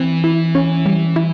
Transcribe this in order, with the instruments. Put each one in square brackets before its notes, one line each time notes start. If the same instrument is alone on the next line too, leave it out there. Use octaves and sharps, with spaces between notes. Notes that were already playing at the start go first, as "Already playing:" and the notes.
Already playing: [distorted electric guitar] E3 [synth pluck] C4
[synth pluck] E4
C#4
G3
E4